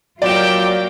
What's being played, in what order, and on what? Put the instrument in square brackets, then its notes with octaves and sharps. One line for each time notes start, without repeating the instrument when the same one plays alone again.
[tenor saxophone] F#3 [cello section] A#3 F4 [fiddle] G4 G5 [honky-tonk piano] D5 E7